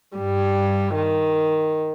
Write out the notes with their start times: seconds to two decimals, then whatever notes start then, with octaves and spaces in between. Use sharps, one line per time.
0.17 G2 G3
0.95 D#3